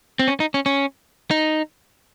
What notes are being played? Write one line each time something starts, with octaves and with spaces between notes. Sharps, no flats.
C4
C#4
D#4
C#4
C#4
D#4